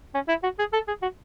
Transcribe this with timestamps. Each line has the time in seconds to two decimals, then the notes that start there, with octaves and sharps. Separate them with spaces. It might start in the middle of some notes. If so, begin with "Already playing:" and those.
0.14 C#4
0.28 E4
0.43 F#4
0.59 G#4
0.73 A4
0.87 G#4
1.02 F#4